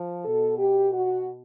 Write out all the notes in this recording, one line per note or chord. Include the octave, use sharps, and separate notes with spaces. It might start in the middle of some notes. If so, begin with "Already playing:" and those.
Already playing: F3
B2 A4
G4
F#4